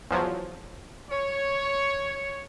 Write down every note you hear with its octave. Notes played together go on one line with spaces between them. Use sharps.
E2 F3 F#3
C#5